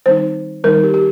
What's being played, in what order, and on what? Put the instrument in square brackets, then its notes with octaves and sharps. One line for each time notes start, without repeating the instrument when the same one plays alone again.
[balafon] D#3 G3 C4 D#4 C5
D#3 G3 C4 D#4 A#4
G4
G4